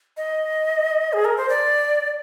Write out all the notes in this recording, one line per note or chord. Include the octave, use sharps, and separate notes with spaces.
D#5
G#4
A#4
C5
D5